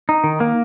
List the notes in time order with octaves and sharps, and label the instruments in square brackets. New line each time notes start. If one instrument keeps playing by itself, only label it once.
[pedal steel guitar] D#4
D#3
A#3